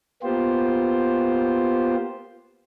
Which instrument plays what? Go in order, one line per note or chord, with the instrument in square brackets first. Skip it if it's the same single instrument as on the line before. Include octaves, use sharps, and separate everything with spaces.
[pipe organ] A#3 B3 F4 G4 C5